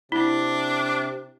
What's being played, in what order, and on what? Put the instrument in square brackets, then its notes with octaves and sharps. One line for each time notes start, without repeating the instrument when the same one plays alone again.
[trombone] C3 [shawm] D4 [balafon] E4